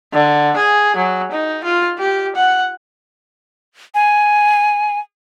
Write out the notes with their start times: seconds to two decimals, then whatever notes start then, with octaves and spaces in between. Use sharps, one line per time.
0.13 D3
0.56 G#4
0.96 F#3
1.31 D#4
1.64 F4
1.98 G4
2.35 F#5
3.95 G#5